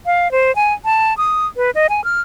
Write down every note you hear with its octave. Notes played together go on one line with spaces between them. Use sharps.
F5
C5
G#5
A5
D#6
B4
D#5
G#5
F6